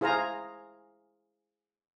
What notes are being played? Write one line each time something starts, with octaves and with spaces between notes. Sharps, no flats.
E4 G#4 C5 F5 G#5 A#5